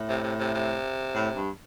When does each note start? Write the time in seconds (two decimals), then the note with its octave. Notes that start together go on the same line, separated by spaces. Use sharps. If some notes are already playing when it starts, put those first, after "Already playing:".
Already playing: A2
0.09 C3
0.23 C3
0.39 C3
0.54 C3
1.15 A2
1.36 G2